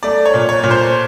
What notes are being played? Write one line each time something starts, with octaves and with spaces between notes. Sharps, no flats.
A3 D5
C#5
A#2
C#5
A#2
C5